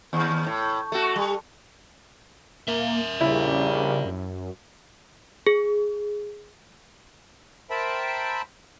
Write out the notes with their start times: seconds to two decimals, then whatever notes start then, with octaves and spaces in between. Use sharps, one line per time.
0.13 D#2
0.47 A2
0.92 A3 F#4
1.16 G3
2.68 A#3 A#4 E5
3.21 A#1 C#3 G3 E4
4.05 F#2
5.47 G#4
7.70 A#4 C5 E5 G5 A5 B5